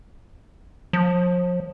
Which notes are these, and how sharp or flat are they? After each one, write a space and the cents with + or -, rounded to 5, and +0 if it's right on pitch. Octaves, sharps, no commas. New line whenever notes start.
F3 +35